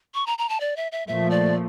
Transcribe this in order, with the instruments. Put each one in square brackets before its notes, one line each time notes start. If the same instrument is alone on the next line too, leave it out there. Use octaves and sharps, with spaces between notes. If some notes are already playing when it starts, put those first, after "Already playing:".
[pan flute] C#6
A#5
A#5
A5
D5
E5
E5
[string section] A#2 F3 A3 [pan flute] E5
[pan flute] D5